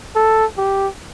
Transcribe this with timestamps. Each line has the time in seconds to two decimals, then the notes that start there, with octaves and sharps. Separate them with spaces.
0.15 A4
0.58 G4